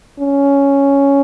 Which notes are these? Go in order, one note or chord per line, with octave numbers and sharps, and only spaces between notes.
C#4